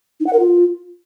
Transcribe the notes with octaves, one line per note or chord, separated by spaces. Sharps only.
D#4
F#5
A#4
F4